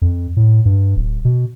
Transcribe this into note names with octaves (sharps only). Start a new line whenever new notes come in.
F2
A2
G2
D1
B2